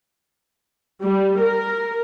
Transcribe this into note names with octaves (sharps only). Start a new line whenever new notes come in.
G3
A#4